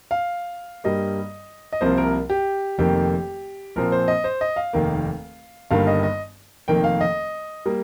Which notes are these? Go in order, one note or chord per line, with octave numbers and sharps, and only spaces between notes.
F5
G2 G3 A#3 D#5
D#5
C2 C3 F3 A#3 C5
A#4
G4
F1 F2 D#3 A#3 G4
A#1 A#2 F3 C4 A#4
C5
D#5
C5
D#5
F5
F1 D#2 D#3 A#3
G1 G2 D#3 A#3 F5
D#5
D#5
F1 F2 D#3 A#3 G5
F5
D#5
G3 A#3